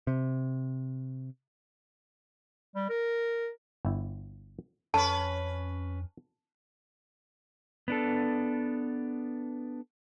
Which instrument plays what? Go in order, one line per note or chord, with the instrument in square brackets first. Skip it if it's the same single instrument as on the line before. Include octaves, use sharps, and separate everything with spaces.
[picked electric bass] C3
[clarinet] G3
A#4
[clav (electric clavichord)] G1 E4
[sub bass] F2 [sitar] C#4 B4 [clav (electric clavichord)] A4 [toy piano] A5
[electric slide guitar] B3 D4 A4